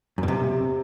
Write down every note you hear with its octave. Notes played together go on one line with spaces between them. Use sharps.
F#2
B2
C3